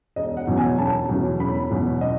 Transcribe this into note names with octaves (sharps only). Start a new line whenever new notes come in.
E1 D#5
F#5
E2 B2 F#3 C#4
G#5
E1 A5
E2 B2 F#3 C#4
E1 B5
E2 B2 F#3 C#4
D#5